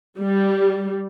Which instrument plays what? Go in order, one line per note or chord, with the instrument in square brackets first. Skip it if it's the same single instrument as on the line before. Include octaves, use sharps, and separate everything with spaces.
[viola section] G3